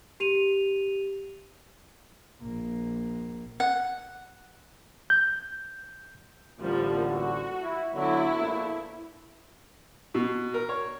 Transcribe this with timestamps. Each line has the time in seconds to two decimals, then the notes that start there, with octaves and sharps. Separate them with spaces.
0.20 G4 D#7 F7
2.42 A#1 A#3
3.60 F#5
5.10 G6
6.60 A1 D3 F3 G3 A#3
7.11 F#4
7.62 E4
7.94 D3 F#3 B3 E4
8.38 A#1 A#2 A3
10.14 B2
10.54 A#4
10.69 C#5